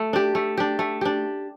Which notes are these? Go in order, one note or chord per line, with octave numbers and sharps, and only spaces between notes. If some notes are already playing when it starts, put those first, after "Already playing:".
Already playing: A3
D4 G4
A3
D4 G4
A3
D4 G4